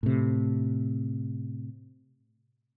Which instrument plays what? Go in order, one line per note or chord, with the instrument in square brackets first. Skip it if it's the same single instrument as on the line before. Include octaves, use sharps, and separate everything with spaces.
[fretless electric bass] A2 C3